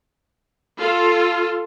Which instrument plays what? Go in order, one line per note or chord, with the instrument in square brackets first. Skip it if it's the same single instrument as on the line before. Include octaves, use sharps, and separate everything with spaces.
[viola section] F4 A4